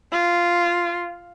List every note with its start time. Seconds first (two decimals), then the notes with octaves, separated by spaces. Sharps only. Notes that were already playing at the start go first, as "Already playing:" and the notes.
0.12 F4